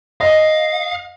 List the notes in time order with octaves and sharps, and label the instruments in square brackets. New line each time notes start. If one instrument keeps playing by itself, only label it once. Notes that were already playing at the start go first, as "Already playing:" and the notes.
[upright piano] D#5 [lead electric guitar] F5